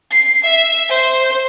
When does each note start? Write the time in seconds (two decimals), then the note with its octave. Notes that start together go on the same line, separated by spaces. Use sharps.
0.11 C7
0.44 E5
0.89 C5